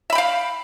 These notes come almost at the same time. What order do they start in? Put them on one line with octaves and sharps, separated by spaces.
E5 B5 G5 F5